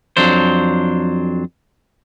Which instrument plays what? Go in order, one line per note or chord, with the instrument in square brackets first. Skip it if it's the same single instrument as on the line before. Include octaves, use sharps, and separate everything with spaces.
[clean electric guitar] F2 F#3 D4 C5